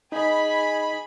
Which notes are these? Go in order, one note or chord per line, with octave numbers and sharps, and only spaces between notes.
D#4 G#4 D#5 B5